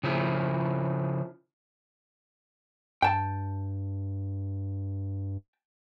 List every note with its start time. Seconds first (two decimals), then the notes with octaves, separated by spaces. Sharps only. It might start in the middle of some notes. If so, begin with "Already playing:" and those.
0.03 C#3 F3 E4
3.02 G2 G5 A5